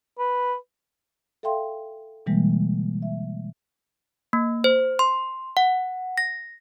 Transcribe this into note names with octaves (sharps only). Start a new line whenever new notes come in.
B4
A4 E5 F5 G5 C6
B2 D3 E3 G3 G#3 A#3
E5
A#3
C5
C6
F#5
A#6